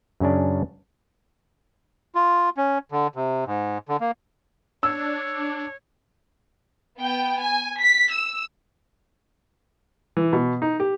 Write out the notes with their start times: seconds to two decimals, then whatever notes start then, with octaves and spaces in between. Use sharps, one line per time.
0.20 F#2 C#3 C#4 D4
2.15 F4
2.57 C#4
2.92 D3
3.15 C3
3.46 G#2
3.89 D3
4.00 A#3
4.83 D4 C#5 E6
6.97 B3 G5
7.38 G#5
7.80 B6
8.12 E6
10.17 E3
10.33 B2
10.62 D#4
10.80 G4